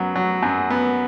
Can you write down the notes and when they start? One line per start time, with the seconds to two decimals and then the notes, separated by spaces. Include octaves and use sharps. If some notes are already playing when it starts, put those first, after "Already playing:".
Already playing: F#2 F#3 B3
0.16 F#3
0.43 F#2
0.70 B3